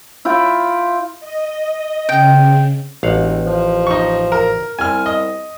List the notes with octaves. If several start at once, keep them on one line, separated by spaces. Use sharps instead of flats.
E4 F4 G5
D#5
C#3 G5
E1 A1 F5 F#5
F3
D#4 C#6
A#4
C2 G#5 F6
D#5